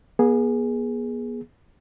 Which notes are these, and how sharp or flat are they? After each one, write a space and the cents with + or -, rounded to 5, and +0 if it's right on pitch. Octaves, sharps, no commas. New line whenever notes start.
B3 -40 G#4 +0